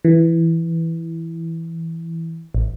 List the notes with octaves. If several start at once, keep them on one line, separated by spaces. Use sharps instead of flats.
E3
A1